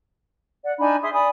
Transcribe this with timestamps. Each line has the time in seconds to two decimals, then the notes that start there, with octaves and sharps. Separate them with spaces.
0.63 D5 F#5
0.78 D4 D#4 G#5 B5
1.01 G#4 E5 C6 D#6
1.13 D5 G#5 B5 D#6